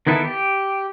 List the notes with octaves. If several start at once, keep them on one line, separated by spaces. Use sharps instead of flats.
D#3 B3 E4 A4
G4